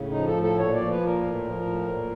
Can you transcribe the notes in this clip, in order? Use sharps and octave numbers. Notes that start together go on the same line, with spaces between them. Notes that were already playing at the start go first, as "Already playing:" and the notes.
Already playing: A2 C#3
D#4
F3
A4
A2
A4
A#2 C#5
D5
F3
B4
A#2
A#4
A2
F3
A2
A#2